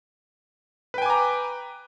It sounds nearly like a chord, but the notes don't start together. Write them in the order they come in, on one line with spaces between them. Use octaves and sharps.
B4 G5 G#5 D6 A#5